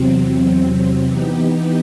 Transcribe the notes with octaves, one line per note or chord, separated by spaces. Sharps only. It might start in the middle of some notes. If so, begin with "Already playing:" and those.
Already playing: E2 C3 F#3 C4
E3 B3 D#4 G4